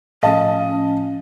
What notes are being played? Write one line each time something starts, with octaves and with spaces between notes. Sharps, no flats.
A2 F3 C#4 D#5 F5 A5